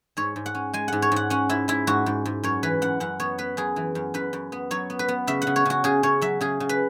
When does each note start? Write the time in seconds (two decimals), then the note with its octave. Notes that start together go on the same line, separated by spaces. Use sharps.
0.17 G#2 C#5
0.36 G#2
0.46 F#5
0.55 C#4
0.73 G#3 G#5
0.88 G#2 F#5
1.02 C#5
1.12 G#2 F#5
1.30 C#4 F#5
1.49 G#2 E4
1.68 G#2 E4
1.87 G#2 F#4
2.06 G#2
2.25 G#2
2.43 F#2 C#5
2.63 E3 B4
2.82 F#2 F#5
3.00 F#2 F#5
3.20 B3 C#5
3.38 B3 B4
3.57 F#2 G#4
3.76 E3
3.95 F#2
4.14 F#2 B4
4.33 F#2
4.52 B3
4.71 F#3 C#5
4.90 B3
4.99 B4
5.08 B3
5.27 C#3 E5
5.42 F#5
5.47 C#3
5.56 C#5
5.65 C#3 F#4
5.84 C#3 G#4
6.03 C#3 C#5
6.21 F#3 E5
6.41 C#3 G#4
6.60 C#3
6.69 B4